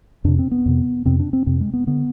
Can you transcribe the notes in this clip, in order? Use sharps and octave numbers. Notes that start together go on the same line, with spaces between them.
F2 C3 D4
C4
B3
F2 C3
F2 C3 C4
D4
C4
F2 C3 C4
G#3
B3
D3 B3